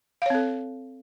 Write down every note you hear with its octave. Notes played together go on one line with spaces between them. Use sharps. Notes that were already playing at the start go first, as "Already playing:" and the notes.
C4 A4 C#5 F5